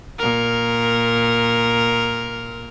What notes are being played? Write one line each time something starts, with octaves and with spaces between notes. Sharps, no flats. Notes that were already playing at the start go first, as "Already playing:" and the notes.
A#2 A#4